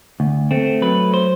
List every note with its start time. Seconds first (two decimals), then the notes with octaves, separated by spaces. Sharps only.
0.20 D2
0.51 A3 C4
0.82 F#3 B4
1.14 C5